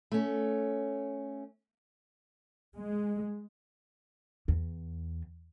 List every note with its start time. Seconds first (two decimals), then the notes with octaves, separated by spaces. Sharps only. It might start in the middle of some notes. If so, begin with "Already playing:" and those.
0.12 A3 C#4
2.75 G#3
4.48 E2